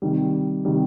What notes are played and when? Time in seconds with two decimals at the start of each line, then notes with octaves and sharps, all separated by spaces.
0.02 C3 D#3 G3
0.65 C3 D#3 G3